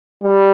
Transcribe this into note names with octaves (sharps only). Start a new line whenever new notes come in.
G3